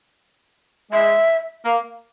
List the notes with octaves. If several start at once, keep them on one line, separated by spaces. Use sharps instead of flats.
G#3 E5
A#3